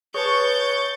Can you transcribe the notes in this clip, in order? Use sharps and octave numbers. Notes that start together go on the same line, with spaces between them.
G#4 B4 C#5 A5 C#6 G6 A6